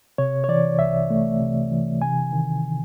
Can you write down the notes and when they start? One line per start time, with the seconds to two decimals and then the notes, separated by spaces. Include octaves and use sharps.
0.18 C3 C#5
0.44 C#5
0.48 E3 D5
0.79 C2 E5
1.10 A3
1.40 C3
1.71 E3
2.02 C3 G#5
2.33 D#3